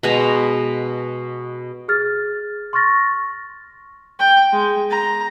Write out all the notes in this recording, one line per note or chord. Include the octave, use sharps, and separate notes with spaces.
B2 G#3 A#5
G#4 F6 A6
C6 C#6 F6 A6 A#6
G5
G#3
A#5